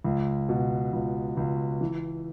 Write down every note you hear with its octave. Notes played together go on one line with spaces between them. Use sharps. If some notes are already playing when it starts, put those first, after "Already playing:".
C#2
B2
C#2
C#2
E3